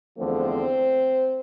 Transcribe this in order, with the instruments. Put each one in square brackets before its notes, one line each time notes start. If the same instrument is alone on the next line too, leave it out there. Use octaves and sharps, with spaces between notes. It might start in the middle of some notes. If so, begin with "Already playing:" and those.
[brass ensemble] E2 D3 F3 A3 C4 C5